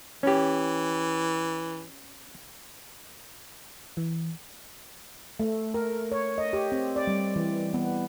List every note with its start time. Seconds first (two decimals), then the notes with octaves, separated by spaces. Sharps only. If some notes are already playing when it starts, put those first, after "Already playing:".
0.23 E3 C#4 G4
3.97 E3
5.40 A3
5.74 A#4
6.12 C#5
6.38 D#5
6.53 G4
6.72 C4
6.96 D5
7.07 G3
7.36 E3
7.74 B3